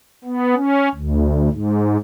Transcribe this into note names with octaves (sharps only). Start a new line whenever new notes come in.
B3
C#4
D2
G#2